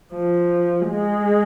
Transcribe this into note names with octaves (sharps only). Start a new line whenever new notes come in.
F3
G#3